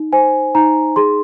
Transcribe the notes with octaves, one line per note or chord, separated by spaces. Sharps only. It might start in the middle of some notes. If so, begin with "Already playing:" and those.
Already playing: D#4
C5 G#5
D#4 A#5
G#4 C6